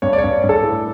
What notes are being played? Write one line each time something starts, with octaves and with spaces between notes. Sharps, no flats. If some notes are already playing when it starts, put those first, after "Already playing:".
G2 C#5
D5
C#5
G2
G2
A4
A2